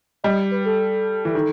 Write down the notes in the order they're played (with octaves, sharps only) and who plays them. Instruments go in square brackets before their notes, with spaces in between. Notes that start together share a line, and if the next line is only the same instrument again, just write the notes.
[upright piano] G3 [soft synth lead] D#5
[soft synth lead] B4
A4
[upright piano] E3
D#3